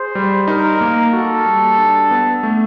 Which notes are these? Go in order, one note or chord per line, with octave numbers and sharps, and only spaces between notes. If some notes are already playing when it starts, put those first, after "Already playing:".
Already playing: G#4 C5
G3
D#4 A#4
A#3
F#4 A4
G3
D4
B3
A3